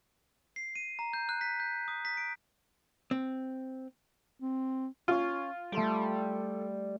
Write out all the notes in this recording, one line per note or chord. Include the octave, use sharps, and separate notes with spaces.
C7
D#7
A#5
G6
F#6
B6
G6
D#6
B6
D7
C4
C4
C#4 F4
G3 A3 A4 C6 D7